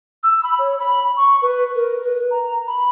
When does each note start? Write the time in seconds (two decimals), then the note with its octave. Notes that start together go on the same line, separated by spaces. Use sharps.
0.23 E6
0.43 B5
0.59 C#5
0.79 B5
1.17 C#6
1.42 B4
1.75 A#4
2.03 B4
2.31 A#5
2.68 B5